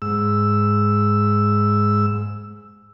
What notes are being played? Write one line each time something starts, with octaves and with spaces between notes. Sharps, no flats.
G#2 E6